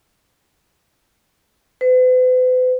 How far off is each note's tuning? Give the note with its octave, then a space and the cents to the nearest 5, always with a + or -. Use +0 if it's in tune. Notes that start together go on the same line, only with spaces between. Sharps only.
B4 +45